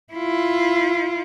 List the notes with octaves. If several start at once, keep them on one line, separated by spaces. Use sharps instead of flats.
E4 F4